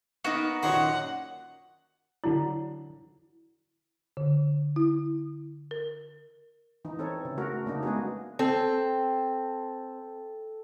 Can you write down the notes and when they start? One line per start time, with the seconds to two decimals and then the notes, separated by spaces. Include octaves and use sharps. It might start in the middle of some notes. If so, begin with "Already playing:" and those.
0.24 A#3 B3 D#4 F#4
0.63 F#2 A#2 D#3 D#4 C5 C#5 F#5
2.24 D3 F#3 D4 E4
4.17 D3
4.76 E4
5.71 A#4
6.85 E3 D#4
6.99 C4 A4 C#5
7.25 C#3
7.37 A3 F#4 A#4
7.66 C#3 A#3 D4 D#4
7.83 G#3 A3 B3 F#4 G#4
8.39 C4 A4